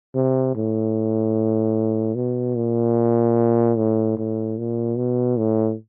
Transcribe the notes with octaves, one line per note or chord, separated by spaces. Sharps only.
C3
A2
B2
A#2
A2
A2
A#2
B2
A2